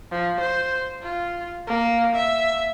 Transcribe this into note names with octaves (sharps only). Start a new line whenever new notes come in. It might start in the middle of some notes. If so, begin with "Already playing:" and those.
F3
C5
F4
A#3
E5